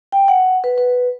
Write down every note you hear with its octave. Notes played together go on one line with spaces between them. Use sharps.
G5
F#5
B4
B4